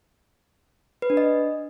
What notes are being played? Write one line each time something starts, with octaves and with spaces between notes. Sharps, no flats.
B4
D4
D#5